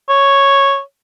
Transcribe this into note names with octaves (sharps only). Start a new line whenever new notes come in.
C#5